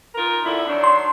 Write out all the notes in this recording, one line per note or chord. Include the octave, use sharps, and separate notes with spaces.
D#4 F4 A#4
F2 D3 E4
D#3 F#3 D4
C6